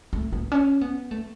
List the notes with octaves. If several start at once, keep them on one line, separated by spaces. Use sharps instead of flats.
A3
B3
C#4
B3
A3